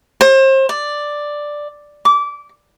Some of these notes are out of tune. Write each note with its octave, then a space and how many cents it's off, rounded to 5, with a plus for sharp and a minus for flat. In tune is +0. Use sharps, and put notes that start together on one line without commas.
C5 +35
D5 +5
D6 -20